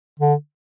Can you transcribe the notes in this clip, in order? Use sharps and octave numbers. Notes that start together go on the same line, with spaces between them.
D3